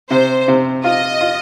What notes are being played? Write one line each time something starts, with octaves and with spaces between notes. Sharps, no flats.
C3 C5
C3
F4 D#5
F4